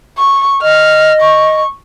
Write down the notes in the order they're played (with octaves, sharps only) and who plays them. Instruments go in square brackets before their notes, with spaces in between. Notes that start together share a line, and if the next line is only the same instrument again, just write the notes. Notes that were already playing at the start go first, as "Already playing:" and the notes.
[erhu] C#6
[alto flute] D#5 [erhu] F6
[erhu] C#6